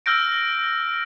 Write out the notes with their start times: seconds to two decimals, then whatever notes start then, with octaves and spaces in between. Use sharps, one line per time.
0.06 E6 F6 G6 A#6 D7